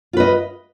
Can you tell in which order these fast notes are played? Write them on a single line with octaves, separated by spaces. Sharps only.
F4 B4 D#5